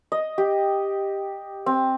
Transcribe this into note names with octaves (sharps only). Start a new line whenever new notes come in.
D#5
G4
C4